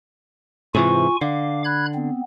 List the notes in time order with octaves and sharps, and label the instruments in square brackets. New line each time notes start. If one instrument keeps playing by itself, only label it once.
[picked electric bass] G#2 C3 E3 [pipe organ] F4 G#5 C#6
[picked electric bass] D3 [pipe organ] F5 D6
[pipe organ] B5 F#6 G#6
B3 C4